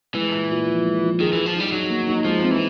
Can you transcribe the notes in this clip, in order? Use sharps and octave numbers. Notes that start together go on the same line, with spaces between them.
E3 G#3
A#2
A#2
F3
G#3
F3
D#3 G#4
E3
G#4
F3
G3 D#4
F#3 D#4
A#3
D#4
F3 G#3
C4
E3